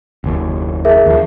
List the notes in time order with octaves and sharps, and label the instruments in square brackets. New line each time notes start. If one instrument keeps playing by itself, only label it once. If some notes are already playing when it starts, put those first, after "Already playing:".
[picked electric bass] F#1 D#2
[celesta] G#4 A#4 E5
[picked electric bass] D#2 F3